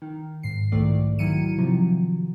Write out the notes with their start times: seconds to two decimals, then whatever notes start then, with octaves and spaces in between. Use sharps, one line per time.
0.02 D#3
0.43 G#2 C7
0.72 B1 E2 G#2 D#3 A3 D5
1.19 D#3 F#3 E4 C#7 D#7
1.58 C3 D#3 F3 F#3